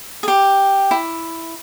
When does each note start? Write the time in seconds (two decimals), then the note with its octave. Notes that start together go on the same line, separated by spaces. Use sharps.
0.23 G#4
0.28 G4
0.91 E4